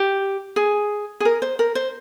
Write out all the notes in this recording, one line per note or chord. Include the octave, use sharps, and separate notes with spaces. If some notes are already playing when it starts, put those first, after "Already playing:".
Already playing: G4
G#4
G#4
A#4
C5
A#4
C5